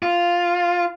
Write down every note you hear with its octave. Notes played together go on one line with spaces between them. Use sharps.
F4